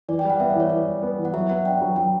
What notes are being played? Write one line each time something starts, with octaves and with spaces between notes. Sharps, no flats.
E3 D5
G5
G3 F#5
B3 E5
D5
E3 C#5
E3 D5
G3
B3
E3
F#5
F#3 E5
B3 F#5
D4 G5
F#3
F#3 G5